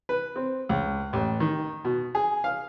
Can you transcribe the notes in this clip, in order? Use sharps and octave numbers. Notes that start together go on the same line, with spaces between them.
B4
C4
C#2
A1
D#3
B2
G#4
F5